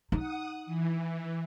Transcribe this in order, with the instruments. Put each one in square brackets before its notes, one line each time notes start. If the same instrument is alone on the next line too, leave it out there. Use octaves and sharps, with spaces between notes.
[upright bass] D#4 [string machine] F#5 D#6
[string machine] E3